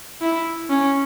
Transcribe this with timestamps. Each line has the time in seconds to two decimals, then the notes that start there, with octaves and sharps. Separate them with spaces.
0.22 E4
0.69 C#4